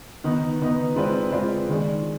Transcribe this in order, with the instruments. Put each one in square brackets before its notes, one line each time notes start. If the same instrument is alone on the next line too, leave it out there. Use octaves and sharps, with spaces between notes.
[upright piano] D#3 B3 D#4 B4
D#3 B3 D#4 B4
G#3 C4 F4 B4 D5
G#3 C4 F4 B4 D5
D#3 G#3 D4